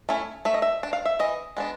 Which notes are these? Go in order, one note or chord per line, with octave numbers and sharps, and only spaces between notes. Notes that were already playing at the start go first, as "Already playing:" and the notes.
A3 C#4 E4
A3 E5
D#5
E5
D4
F5
E5
E3 D#5
G#3 B3 D4